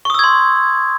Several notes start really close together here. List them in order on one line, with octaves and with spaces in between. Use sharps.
C#6 D#6 E6 G#6 C6